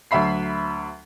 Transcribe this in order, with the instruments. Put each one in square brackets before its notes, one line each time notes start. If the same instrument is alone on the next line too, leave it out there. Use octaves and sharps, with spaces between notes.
[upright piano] D2 F#3 E5 B5 C7